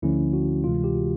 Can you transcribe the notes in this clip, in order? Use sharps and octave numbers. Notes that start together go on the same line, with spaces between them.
D2 D3 F3 A3 C#4 E4
F#4
D2 C3 E3 G#3 F4
G4
F#4